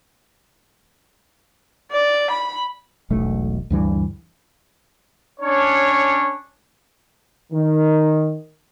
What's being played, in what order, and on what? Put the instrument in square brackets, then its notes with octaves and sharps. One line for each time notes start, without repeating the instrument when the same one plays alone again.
[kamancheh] D5
B5
[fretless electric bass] E1 B1 A3
D2 G2 E3
[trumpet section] C#4 D4 C#5
[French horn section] D#3